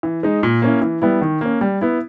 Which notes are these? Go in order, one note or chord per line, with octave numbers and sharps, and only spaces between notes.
E3
G#3 D#4
A#2
A#3 C#4 E4
E3
G3 B3 E4
D#3
A#3 C#4
G3
B3 E4